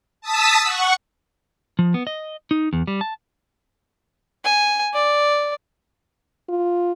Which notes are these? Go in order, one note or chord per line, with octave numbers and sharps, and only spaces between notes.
A5 D#6 E6 B6
F#5 C#6
F3
B3
D#5
D#4
E2
G3
A5
G#5
D5
F4